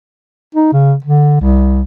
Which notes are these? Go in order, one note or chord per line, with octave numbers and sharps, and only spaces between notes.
D#4
C#3
D3
C2